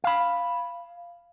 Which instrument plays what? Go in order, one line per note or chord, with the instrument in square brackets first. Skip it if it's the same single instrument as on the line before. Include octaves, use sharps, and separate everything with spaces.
[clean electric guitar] F5 B5